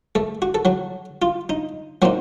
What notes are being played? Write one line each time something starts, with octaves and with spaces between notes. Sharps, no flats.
A3 A4
F#4
A4
F#3 F#4
F4
D#4
A#2 F#3 C4 D#4 F#4